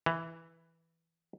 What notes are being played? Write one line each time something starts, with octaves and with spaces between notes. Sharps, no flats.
E3